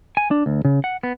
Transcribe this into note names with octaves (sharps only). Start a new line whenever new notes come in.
G#5
D4
D2
C#3
F#5
B3